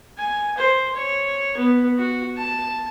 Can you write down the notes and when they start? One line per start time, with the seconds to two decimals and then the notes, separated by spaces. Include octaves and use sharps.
0.18 G#5
0.58 C5
0.95 C#5
1.57 B3
1.98 F#4
2.37 A5